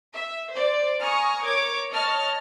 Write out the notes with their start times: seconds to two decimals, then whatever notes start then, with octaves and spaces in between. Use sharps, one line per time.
0.14 E5
0.51 C5 D5
1.01 G#5 A#5 C#6 D#6 F6
1.45 A#4 C#5 D6 G#6
1.90 C#5 D#5 A5 F6